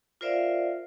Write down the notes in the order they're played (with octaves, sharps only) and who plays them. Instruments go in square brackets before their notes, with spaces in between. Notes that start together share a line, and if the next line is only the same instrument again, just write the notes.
[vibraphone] F4 A#4 C5 D5 E5 F5